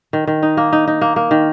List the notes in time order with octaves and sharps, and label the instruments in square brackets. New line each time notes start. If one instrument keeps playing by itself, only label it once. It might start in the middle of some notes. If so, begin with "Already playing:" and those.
[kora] D#3
D#3
D#4
A#3
D#4
D#4
A#3
A#3
D#3